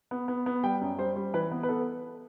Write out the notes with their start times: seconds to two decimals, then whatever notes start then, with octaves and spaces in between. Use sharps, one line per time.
0.11 B3
0.28 B3
0.46 B3
0.64 G3 G5
0.81 F#2
0.98 G3 C5
1.16 G3
1.34 E3 B4
1.51 B3
1.63 B4
1.69 B3 A4